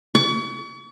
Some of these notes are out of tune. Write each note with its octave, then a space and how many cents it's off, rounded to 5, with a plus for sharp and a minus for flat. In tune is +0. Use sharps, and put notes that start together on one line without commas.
C#6 +40